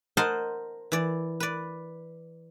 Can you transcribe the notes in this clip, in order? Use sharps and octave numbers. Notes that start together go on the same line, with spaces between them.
A#4 C5 D#5 F#5 A5 C6
E3 D5
B4 D5